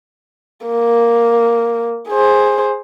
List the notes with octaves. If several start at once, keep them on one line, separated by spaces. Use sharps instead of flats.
A#3
G#4 C5